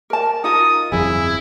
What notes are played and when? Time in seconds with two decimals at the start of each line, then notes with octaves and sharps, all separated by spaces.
0.10 A#4 A5
0.44 D#4 F4 A#4 D#6
0.92 G1 F2 E4 G#4